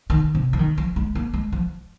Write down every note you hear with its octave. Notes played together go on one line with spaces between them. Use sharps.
D#3
C3
F3
D#3
F3
G#3
A#3
G#3
F3